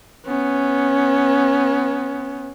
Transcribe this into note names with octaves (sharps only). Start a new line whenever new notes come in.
B3 C#4